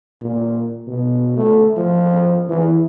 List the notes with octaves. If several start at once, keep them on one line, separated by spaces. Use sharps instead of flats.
A#2
B2
A3
F3
E3